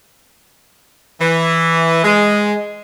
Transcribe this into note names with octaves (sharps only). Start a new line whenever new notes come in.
E3
G#3